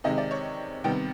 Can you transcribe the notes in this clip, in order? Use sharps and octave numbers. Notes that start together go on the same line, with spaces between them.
C3 D#3 G#3 D#5
D5
C#5
C3 D#3 G3 B3 G5